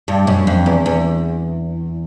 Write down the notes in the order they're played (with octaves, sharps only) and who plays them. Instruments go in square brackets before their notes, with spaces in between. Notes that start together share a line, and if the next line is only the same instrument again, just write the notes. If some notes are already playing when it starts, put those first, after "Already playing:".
[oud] G2
F#2
F2
E2
E2